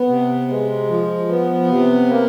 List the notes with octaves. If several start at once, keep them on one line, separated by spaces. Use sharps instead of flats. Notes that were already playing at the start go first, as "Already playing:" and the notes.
Already playing: B3
C3
G#3
F3
B3
C3
A#3